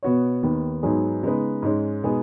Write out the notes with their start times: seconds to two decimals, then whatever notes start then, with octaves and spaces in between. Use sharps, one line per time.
0.03 B2 B3 F#4 C#5
0.43 D#2 D#3 B3
0.83 G#2 F#3 B3 D#4 G#4
1.23 C#3 G#3 B3 D#4 B4
1.62 G#2 G#3 C#4
2.03 B2 G#3 B3 D#4 G#4